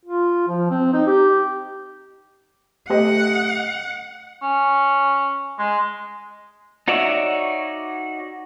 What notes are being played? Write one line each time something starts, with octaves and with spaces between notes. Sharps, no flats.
F4
F3
C4
D#4
G4
A3 G4 D#5 F#5
C#4
G#3
D#4 F#4 C#5 D5 E5